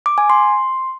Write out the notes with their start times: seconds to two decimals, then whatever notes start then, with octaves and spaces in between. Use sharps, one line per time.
0.06 D6
0.18 G#5
0.30 C6